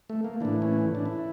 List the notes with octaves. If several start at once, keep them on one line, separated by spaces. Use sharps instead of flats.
A3
A#3
A2 E3 D4
C#4
D4
E4